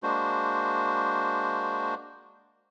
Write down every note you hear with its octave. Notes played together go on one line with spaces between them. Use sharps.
G#3 A#3 D4 F#4 C5